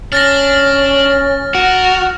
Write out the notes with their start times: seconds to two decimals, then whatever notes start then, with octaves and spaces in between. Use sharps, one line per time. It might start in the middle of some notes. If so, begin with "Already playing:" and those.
0.12 C#4 D4 F6 A6 A#6
1.55 F#4 A#4